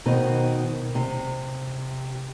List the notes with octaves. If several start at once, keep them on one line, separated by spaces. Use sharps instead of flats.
B2 D#3 C4
C3